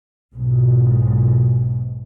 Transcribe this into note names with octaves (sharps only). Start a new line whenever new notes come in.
B1 G#2 B2